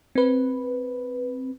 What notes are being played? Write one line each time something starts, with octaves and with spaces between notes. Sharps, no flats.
C4 B4